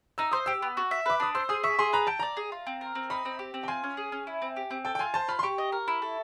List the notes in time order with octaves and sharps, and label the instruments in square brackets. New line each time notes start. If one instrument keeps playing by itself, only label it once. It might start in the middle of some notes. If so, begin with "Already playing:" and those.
[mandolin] D#4 [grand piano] E6
[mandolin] C5 [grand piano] D#6
[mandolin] G4 [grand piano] E6
[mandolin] B3
F#4
E5
[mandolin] B4 [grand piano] D6
[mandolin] D4 [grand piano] D#6
[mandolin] C5 [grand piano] E6
[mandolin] G#4 [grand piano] D#6
[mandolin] E5 [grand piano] C#6
[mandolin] G#4 [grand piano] C6
[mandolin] B4 [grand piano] A#5
[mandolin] G5 [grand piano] A5
[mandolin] D5 [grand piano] A#5
[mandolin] G#4
F4
C4
A#4
C4
[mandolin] D#4 [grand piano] B5
[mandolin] C4
G4
C4
[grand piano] G5
[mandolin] F4 [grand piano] G#5
[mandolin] C#4
G#4
C#4
E4
C4
G4
C4
[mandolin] A4 [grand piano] G5
[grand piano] G5
[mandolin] F4 [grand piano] G#5
[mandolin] C5 [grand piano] A5
[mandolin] F4 [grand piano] B5
[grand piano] C6
[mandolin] G4 [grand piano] C#6
[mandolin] D#5
A#4
E4
A4